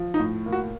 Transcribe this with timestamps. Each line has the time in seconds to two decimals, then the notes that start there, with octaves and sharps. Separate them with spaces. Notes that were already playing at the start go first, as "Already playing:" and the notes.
Already playing: F3
0.14 D#4
0.20 A2
0.46 A#3
0.52 F#4